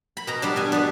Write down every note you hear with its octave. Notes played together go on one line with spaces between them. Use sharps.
B5
B2 A#5
G3 B3 D4 A5
B2 G#5
G3 B3 D4